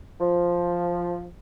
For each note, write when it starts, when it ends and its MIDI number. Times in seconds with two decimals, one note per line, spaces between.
0.20 1.25 53